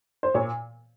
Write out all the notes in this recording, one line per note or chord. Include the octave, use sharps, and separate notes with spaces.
C5
A#2 C#5